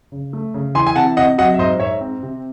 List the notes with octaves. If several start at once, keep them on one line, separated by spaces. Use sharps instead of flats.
C#3
A3
C#3
E3 G#5 C6
G#5
C3 F#5 A5
C3 D#5 F#5
F#3 D#5 F#5
E5
G#2 C5 D#5
G#2 C#5 E5
C4
C3